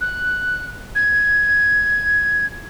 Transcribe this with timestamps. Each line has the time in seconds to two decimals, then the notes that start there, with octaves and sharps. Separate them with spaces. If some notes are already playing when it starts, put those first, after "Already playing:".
0.01 F#6
0.95 G#6